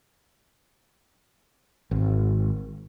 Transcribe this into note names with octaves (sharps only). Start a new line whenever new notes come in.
G#1